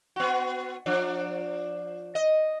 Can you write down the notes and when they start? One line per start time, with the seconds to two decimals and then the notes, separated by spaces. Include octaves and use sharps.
0.16 B3 F#4
0.86 F3 D4
2.15 D#5